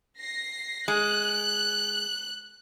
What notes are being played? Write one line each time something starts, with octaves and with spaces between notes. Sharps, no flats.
A#6 C7
G#3 F#6